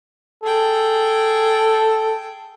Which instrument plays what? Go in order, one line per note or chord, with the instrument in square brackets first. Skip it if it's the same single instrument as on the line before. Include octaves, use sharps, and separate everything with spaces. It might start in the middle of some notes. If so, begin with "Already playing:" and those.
[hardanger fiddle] G#4 G5 [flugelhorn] A4